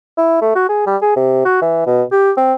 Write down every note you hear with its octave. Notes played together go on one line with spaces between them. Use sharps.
E4
A3
F#4
G#4
G3
G#4
C3
F#4
E3
B2
G4
C4